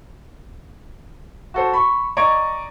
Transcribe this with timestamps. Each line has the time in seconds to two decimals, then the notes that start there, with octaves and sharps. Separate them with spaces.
1.54 F#4 A4 C5
1.74 B5 C#6
2.17 D5 D#5 A#5 C#6 G#6 D7